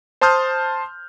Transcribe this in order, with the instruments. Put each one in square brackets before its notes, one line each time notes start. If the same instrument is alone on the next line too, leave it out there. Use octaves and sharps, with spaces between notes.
[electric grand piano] C5 A5 C6 D#6 F6 G6